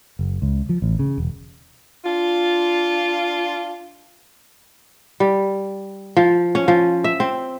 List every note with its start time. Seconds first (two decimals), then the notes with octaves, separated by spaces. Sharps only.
0.19 F#1
0.42 C#2
0.69 F3
0.82 A1
0.99 C#3
1.18 E1
2.05 D4 F4
5.20 G3
6.17 F3
6.55 C#4
6.68 F3
7.04 E5
7.20 C4